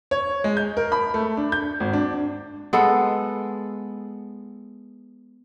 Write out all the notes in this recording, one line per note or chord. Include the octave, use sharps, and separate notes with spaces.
C#5
G#3
G6
A#4
B5
A3
D4
G6
G#1
D4
G#3 B3 A4